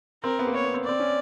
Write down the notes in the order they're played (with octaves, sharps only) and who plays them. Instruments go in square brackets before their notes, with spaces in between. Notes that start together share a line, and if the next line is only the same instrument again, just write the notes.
[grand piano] C4 [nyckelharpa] A#4
[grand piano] B3
A#3
[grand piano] B3 [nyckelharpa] C#5
[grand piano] B3
C4
[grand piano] C4 [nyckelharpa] D5
[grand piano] C#4